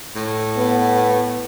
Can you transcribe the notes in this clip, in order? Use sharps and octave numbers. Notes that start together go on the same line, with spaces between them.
A2
B3